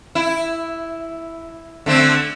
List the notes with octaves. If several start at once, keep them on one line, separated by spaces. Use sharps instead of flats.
E4
D3 A3 C4